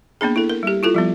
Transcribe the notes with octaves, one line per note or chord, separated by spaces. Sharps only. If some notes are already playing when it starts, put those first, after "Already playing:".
A#3 B3 D4 G#4
E4 A4
A#4
G3 G4
E4 F4 A4
F3 G3 B3